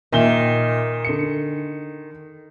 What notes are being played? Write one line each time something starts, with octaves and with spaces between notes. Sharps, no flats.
A#2 D#3 E5 G7
D3 C#7